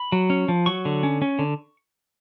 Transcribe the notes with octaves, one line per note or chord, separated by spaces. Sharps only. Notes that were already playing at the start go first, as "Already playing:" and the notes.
Already playing: B5
F#3
C#4
F3
F#3 C#6
D3
C#4
C#4
D3